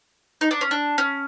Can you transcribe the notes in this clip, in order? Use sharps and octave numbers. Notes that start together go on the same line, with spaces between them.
D#4
D4
C#4
D4
C#4